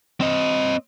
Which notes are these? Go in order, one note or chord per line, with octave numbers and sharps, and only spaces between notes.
C4 D#5